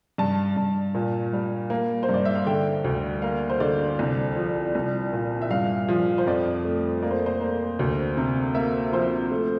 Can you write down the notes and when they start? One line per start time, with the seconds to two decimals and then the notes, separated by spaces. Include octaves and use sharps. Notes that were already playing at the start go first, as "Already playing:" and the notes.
0.18 G2 A5
0.57 G2
0.94 A#2
1.33 G3
1.70 A#3
2.03 C5
2.09 G2
2.14 D5
2.25 E5
2.35 F5
2.46 D3 G5
2.84 D2
3.22 A#3 F5
3.50 C5
3.60 D3 D5
3.99 C2
4.36 F3
4.75 C2
5.13 A#2
5.42 E5
5.50 G2 F5
5.89 F3
6.18 C5
6.26 F2 D5
6.65 A3
7.02 A#3 D5
7.11 C5
7.26 C5
7.41 A#3
7.79 D2
8.17 C3
8.54 A#3 E5
8.92 F3 C5
9.31 A3